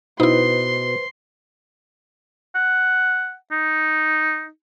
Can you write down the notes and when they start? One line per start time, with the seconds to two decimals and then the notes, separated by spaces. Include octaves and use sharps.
0.20 B2 D#4 E4 B4 C5 D#5 C6
2.55 F#5
3.52 D#4